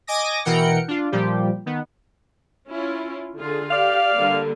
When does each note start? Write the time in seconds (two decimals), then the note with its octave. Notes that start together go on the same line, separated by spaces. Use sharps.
0.07 D#5 G#5 D6 D#6 A#6
0.45 B2 E3 A#4 F#5 G5 C#7
0.88 D4 F4
1.12 A#2 F3 G3 G4
1.66 D#3 B3
2.70 C#4 E4 F4
3.38 D3 F4 G#4
3.71 G4 D5 F5
4.17 D3 G3 A#3